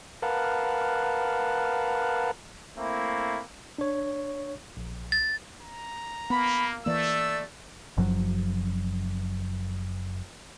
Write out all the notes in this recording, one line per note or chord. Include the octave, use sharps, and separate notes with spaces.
A#4 B4 F5 F#5 A5
A3 A#3 C4 E4
D4 C#5
A#1
A6
A#5
A#3 B3 B5
E3 A3 A#3 D5 E6
F#1 F#2 F3 F#3